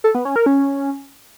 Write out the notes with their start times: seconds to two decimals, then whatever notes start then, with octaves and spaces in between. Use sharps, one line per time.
0.04 A4
0.15 B3
0.25 C#4
0.36 A#4
0.46 C#4